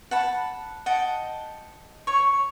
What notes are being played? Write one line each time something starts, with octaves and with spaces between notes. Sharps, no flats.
F#5 A5 B5
D#5 F#5 G5 A5
C#5 C#6